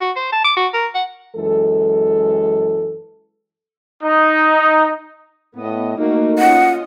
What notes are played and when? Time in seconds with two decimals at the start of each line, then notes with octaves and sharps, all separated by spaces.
0.01 F#4
0.16 C5
0.33 A5
0.44 D6
0.57 F#4
0.74 A#4
0.95 F#5
1.36 F#2 E3 G#3 A4
4.03 D#4
5.56 A2 B3 D#5
5.98 A3 A#3 D#4 F#4
6.39 C#4 F4 D#5 F#5